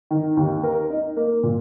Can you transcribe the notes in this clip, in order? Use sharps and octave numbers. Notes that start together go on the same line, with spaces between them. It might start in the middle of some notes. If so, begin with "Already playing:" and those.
D#3
D#2
A#4
D#4
A#3
A#2